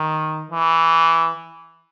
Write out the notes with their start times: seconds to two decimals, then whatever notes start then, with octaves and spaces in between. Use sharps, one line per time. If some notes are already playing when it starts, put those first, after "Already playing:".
Already playing: D#3
0.51 E3